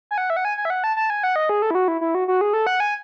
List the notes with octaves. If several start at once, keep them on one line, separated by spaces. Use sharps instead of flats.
G#5
F#5
E5
F#5
G#5
G#5
E5
F#5
A5
A5
G#5
F#5
D#5
G#4
A4
E4
F#4
E4
E4
F#4
F#4
G#4
A4
F#5
G#5